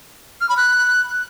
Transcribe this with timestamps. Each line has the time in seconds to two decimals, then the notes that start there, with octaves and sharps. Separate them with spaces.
0.41 F6
0.49 B5
0.57 F#6